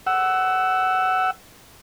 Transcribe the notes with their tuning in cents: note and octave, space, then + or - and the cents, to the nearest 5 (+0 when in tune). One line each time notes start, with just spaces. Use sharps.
F#5 +20 E6 +0